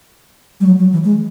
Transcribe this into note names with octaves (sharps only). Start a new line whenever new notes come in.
G3
F#3
F#3
E3
G#3